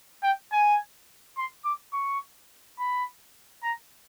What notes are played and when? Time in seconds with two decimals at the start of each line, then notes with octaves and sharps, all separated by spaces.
0.23 G5
0.52 G#5
1.38 C6
1.65 D6
1.93 C#6
2.79 B5
3.63 A#5